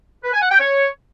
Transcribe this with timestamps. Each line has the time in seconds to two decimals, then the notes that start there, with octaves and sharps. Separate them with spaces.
0.23 B4
0.33 G#5
0.42 F#5
0.51 G5
0.60 C#5